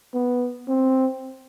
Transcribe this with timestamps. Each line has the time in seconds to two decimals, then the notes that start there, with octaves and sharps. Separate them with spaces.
0.14 B3
0.68 C4